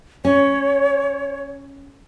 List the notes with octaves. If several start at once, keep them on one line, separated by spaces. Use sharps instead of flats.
C#4 C#5